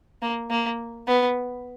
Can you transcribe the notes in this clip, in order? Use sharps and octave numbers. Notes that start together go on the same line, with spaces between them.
A#3
A#3
B3